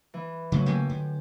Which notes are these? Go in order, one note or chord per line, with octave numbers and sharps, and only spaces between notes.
E3
C#3 F#3 A3
C#3 A3 A#3 G4 G5 G#5
D3